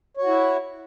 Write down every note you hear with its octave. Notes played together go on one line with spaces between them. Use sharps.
E4 F#4 C#5